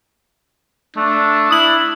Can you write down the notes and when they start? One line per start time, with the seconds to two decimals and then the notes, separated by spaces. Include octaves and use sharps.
0.97 A3 D4
1.51 E4 D#6 F#7